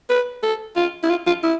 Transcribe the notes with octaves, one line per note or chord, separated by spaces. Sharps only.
B4
A4
F4
E4
F4
F4
E4